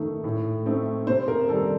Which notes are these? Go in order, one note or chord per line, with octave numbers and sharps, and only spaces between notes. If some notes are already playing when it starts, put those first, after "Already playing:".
Already playing: D#3 A3 D#4
A2
A3 C4 D#4
C3 C5
A#4
D#3 G3 D4 A4